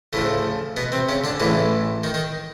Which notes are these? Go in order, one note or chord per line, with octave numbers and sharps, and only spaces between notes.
D2 A2 C#3 F3 A3
B2 B3
C3 C4
C#3 C#4
D3 D4
A1 A2 C#3 E3 C#4
D#3 D#4
D#3 D#4